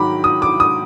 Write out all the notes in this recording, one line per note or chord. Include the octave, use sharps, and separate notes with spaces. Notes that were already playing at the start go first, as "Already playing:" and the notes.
Already playing: G#2 D#3 F#3 A#5 B5 D6
D#6
D6
D#6